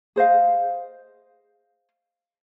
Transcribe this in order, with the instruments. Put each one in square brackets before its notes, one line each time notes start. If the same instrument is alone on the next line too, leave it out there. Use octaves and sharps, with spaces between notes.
[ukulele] G#4 C5 D#5 F5